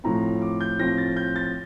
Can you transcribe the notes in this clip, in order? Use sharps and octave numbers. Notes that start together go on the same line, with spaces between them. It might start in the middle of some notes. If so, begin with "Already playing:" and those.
A2 F3 C4 A#5
D6
G6
A2 F3 C4 A#6
A6
G6
A6